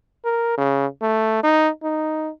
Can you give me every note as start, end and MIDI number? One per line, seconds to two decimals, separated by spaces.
0.25 0.57 70
0.58 0.86 49
1.02 1.39 57
1.43 1.69 63
1.83 2.30 63